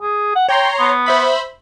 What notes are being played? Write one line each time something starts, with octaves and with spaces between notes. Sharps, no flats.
G#4
F#5
C#5 G5 A#5 C6
B3
C5 E5 B5